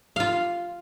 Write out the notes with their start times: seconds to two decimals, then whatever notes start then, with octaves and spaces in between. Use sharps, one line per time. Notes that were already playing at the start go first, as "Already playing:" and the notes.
0.16 F4 F5